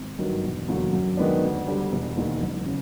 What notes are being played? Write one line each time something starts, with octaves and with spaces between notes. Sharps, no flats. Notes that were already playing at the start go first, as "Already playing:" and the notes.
Already playing: G#1
G2 D#3 F#3
E1
D#2 D3 F#3
F#2
D#3 G#3 B3 D4
D2
D3 G3
E1
D#2 D#3 G#3
F#1
C#3